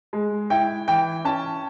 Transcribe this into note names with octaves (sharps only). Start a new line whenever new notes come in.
G#3
E4 G5
E3 G5
C#4 A5